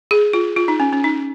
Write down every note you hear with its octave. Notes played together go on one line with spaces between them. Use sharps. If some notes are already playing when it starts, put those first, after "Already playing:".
G#4
F4
F4
D#4
C#4
C#4
D#4